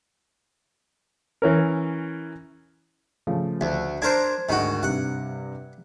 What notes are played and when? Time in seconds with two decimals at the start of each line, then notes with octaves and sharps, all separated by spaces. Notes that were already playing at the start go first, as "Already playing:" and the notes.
1.42 E3 C#4 A#4
3.27 C#3 F3 A3
3.61 D2
4.02 D4 A#4 C5 G#6
4.49 D2 G#2 D#3 F#4
4.83 G2 C3 G3 F#5